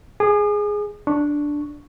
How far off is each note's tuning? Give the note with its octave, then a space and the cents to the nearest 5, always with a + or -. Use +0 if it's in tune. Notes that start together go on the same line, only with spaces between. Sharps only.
G#4 +0 D#6 -45
D4 +0 C#6 +0